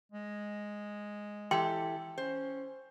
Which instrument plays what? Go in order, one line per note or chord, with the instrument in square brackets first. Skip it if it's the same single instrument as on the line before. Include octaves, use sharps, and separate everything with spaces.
[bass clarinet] G#3
[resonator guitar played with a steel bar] E3 G4 A4 [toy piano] G5 C6
[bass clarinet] C#4 [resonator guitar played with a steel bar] C5